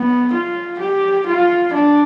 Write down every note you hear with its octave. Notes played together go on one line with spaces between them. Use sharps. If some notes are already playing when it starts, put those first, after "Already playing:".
Already playing: B3
F4
G4
F4
D4